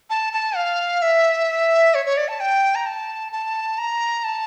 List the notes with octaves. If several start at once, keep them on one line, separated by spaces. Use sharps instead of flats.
A5
A5
F5
E5
C#5
C#5
D5
A5
G5
A#5
A5
A5
A#5
A5